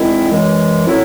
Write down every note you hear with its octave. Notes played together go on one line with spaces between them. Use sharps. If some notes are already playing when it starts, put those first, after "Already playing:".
Already playing: E2 D#3 G#3 C4 E4
F#2 E3 G#3
A2 F#3 C4 E4